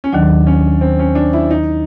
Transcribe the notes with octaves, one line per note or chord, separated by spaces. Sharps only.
C#4
D#2 D#3 F#3 D4
C#4
C4
C#4
D4
E4
D#4